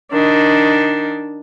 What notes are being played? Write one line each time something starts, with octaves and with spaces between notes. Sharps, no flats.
D#3 D4